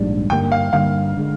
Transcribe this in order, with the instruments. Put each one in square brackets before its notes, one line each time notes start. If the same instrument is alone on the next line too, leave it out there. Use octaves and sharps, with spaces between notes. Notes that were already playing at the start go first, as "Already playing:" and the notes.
Already playing: [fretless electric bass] A#1 G#2 G3 D4
[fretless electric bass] G2 D3 G3 A#3 [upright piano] G5
[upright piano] F5
[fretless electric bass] G2 D3 G3 A#3 [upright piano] F5
[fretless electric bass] D3 G#3